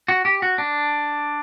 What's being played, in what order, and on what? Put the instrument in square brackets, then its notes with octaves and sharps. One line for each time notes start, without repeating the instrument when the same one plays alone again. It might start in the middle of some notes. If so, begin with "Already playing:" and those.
[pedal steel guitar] F#4
G4
F#4
D4